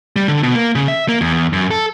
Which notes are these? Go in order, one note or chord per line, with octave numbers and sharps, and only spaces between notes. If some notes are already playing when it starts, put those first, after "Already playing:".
G3
D3
B2
A#3
C#3
E5
A#3
E2
F#2
A4